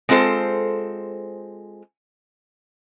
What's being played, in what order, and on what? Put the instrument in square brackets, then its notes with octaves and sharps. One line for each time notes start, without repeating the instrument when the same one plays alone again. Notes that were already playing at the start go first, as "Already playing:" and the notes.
[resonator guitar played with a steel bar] G#3 C4 F4 A4 C5